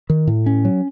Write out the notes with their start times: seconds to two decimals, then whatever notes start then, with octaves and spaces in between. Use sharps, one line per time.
0.10 D#3
0.27 A2
0.46 C#4
0.65 F#3